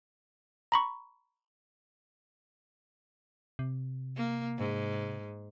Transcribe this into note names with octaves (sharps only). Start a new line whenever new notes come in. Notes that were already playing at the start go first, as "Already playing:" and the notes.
A#5 B5 C#6
C3
A#3
G#2